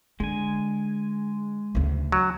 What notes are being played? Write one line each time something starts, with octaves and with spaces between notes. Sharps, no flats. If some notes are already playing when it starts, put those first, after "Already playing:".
D3 G#3 G#5
D2 C#3
F#3